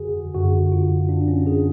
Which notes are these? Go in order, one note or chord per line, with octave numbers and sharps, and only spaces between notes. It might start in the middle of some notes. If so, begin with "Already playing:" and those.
Already playing: F2 D3 F#4 G#4
F#2 D3 F#4
F4
D4
C#4
G#4